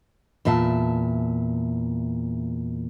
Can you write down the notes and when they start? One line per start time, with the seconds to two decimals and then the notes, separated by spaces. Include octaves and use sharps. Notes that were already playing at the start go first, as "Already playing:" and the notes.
0.45 E2 A#2 E5 F5 A5